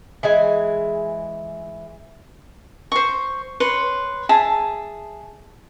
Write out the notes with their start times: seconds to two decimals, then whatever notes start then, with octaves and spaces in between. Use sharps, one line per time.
0.23 E3 G#3 G#5
2.92 C5 C#6
3.60 B4 C#5 C6
4.29 G#4 E5 A5